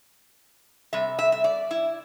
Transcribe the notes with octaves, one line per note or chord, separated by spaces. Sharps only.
C3 G3 E5
E5
E5
D5
E4